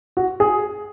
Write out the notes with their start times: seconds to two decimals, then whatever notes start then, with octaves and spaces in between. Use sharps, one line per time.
0.17 F#4
0.40 G#4